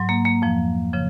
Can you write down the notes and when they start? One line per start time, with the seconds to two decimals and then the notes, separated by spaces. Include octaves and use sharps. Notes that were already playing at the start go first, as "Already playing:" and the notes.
Already playing: G#2 F#3
0.09 A#3
0.25 A#3
0.42 F2 F3
0.93 C#3 F3